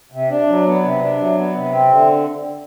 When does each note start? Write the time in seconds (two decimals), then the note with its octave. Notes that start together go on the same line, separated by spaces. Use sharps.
0.12 C3
0.30 D4
0.48 F#3
0.65 B3
0.83 C3
1.01 D4
1.18 F#3
1.36 B3
1.55 C3
1.72 C4
1.90 D3